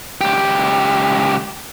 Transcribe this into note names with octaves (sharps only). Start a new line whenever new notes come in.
C#2 G4